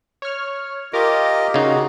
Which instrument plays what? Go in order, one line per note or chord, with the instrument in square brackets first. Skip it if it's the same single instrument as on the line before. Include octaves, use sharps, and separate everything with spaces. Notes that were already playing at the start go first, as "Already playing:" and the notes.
[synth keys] C#5 F6
[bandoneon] F4 G4 D#5 [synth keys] A#4 D6
[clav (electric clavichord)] C#3 D#4 [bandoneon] F#4